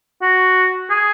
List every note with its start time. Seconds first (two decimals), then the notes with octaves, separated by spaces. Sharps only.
0.22 F#4
0.90 G#4